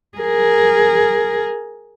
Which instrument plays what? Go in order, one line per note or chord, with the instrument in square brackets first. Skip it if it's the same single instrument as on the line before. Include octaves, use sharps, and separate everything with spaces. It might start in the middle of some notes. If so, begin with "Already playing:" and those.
[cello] G#4 A#4